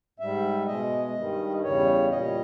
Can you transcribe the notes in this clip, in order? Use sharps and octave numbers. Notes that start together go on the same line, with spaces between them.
G#2 G3 E5
B2 G#3 D#5
G2 D#3 G3
E2 C#3 G3 C#5
A#2 G3 D#5